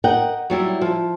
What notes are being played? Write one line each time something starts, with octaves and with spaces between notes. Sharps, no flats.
A#4 D#5 F#5 G5
F#3 G3 E4
F3